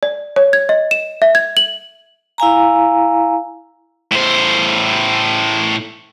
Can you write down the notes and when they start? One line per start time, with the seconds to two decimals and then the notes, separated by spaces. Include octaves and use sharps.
0.03 D5
0.36 C#5
0.53 G#6
0.69 D#5
0.91 E7
1.22 E5
1.35 G#6
1.57 F#7
2.38 E4 F5 G#5 A#5
4.12 A2 C5